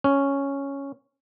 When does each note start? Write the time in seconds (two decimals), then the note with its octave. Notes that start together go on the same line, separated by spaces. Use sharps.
0.04 C#4